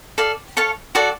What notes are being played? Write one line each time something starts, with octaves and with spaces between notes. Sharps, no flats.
A4 D5 F5
A4 C#5 F5 A5
F#4 A4 D5 F#5